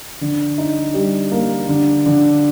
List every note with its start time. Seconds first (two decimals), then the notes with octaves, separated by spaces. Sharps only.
0.21 D3
0.58 D#4
0.94 G3
1.32 A#3
1.69 D3
2.06 D3